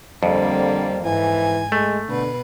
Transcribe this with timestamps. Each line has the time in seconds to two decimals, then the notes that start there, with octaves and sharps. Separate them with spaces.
0.23 F2 D3 G3 A#3 C4
1.04 G#2 E3 G#5
1.72 G#3 A3
2.08 B2 D3 B4